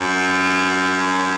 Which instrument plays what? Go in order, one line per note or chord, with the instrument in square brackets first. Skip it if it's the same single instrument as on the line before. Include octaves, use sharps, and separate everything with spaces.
[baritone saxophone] F#2